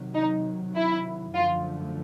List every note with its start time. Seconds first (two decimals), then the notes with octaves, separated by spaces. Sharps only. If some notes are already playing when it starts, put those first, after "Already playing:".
Already playing: C3 D#3 F#3
0.15 D#4
0.75 E4
1.34 F#2 D3 F3 A3 F4